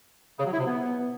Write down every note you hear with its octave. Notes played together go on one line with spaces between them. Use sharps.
C#3
F#3
E4
C3
B3